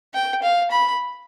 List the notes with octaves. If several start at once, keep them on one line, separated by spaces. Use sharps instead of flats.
G5
F5
B5